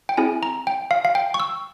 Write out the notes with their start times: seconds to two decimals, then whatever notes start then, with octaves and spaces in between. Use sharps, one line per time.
0.09 G5
0.17 C4 E4 G#4 G#5
0.43 A#5
0.67 G5
0.91 F5
1.05 F5
1.15 G5
1.34 C#6
1.40 E6